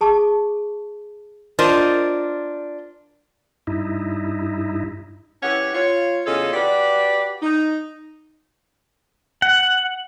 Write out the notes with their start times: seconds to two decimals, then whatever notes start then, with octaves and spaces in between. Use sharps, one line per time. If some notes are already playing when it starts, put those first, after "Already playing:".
0.01 G#4 A5 C#6 D6
1.59 D4 F4 A#4 C5 D#5
3.67 G2 D#4 E4
5.43 E3 C#4 G4 C#5 F#5
5.75 F4 C#5
6.26 E2 C#3 F4 A4 C#5 D#5
6.53 F#4 G4 B4 D5
7.42 D#4
9.42 F#5